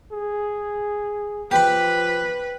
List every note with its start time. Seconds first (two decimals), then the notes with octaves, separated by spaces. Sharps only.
0.12 G#4
1.51 F3 G4 B4 B5